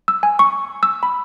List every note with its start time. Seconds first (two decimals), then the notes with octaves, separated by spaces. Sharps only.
0.08 E6
0.23 G#5
0.39 C#6
0.83 E6
1.03 B5